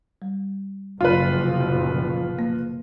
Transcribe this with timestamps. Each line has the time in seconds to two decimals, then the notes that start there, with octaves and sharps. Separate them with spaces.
0.22 G3
1.01 F#1 B2 F3 F4 B4
1.37 F#2 C3
2.39 A#3